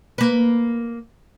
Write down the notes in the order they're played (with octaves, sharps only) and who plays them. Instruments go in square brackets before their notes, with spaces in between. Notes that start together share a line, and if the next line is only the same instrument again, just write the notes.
[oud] A#3 B4